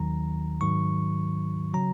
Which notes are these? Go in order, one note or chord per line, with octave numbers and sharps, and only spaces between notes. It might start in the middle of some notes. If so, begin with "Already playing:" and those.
Already playing: D#2 D#3 F#3 A#5
G#2 D#3 F#3 C#6
C#3 F#3 A#5